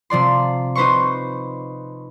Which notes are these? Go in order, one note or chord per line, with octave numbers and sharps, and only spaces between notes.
C3 F3 D5 C6
D#4 B4 C5 C6 C#6